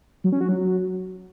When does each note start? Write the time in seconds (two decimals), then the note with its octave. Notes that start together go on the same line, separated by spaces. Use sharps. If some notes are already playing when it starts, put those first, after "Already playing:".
0.24 F#3
0.32 C#4
0.41 F#4
0.49 F#3